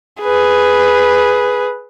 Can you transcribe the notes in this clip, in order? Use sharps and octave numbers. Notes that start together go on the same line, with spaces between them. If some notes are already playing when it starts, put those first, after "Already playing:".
G#4 B4